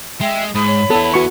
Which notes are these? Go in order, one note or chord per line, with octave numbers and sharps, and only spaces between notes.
G#3 E5 G5
G#2 B5 D#6
C#5
B3 E4 A4
F#4 B4 C#6